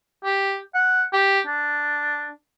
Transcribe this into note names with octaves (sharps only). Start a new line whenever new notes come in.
G4
F#5
G4
D4